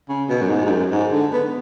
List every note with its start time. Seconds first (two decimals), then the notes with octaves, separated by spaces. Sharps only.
0.09 C#3
0.29 B2
0.41 F#2
0.50 G#2
0.66 G#2
0.70 F#2
0.91 G#2
1.12 D3
1.33 B3